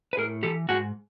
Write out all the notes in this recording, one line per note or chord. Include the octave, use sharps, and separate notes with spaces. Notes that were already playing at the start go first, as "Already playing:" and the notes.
B4
A2 G#4 A#4
E3 G4 A4
G#2 F#4 G#4